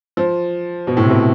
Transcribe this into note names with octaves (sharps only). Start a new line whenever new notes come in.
F3
B2
A2
C3
B2